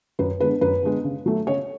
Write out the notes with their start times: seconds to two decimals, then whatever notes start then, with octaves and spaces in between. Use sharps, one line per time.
0.19 F#2 B4
0.40 D3 G#3 B3 B4
0.61 F#2 B4
0.83 D3 G#3 B3
1.04 C#3
1.26 F#3 A3
1.47 C#3 C#5